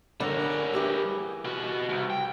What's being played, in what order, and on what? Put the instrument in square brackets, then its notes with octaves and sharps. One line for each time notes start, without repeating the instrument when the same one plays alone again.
[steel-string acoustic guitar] D3 C#4 [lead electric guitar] G3 A#4
[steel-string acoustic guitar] E3 G4 G#4
[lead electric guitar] B2 F#4
C2
G5